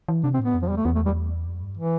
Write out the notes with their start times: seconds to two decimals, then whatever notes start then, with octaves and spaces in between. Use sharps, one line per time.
0.08 E3
0.23 C3 D4
0.34 C4
0.39 A2 B3
0.54 F2
0.62 F3
0.69 E2 G3
0.77 A3
0.85 E2 B3
0.95 A3
1.05 G3
1.46 F2
1.62 G2
1.77 E3